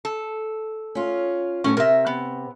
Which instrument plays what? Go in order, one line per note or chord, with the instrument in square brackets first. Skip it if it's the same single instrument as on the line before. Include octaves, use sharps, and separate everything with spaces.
[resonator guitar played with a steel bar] A4
[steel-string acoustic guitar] C#4 F4
[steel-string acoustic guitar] A2 F#3 B3 [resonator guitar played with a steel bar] C#4
[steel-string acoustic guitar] C3 [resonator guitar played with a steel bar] A#4 E5
[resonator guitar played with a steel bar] B3